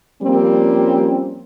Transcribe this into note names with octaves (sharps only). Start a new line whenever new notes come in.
F3 G3 A#3 C4 C#4